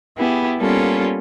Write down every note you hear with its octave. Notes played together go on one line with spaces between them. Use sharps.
B3 E4 G4 G#4
G3 A#3 B3 C#4 F4 A4